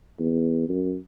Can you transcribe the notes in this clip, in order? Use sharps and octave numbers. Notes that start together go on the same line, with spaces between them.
E2
F#2